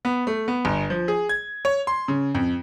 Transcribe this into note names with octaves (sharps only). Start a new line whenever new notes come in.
B3
A3
B3
G1
F3
G#4
G#6
C#5
C6
C#3
F2